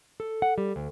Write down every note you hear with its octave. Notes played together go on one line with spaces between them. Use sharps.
A4
F#5
G3
D2